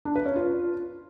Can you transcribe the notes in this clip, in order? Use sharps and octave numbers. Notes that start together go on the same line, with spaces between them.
D4
B4
C#4
F4